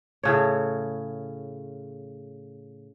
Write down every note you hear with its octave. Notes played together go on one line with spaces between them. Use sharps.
A2 C#3 C#5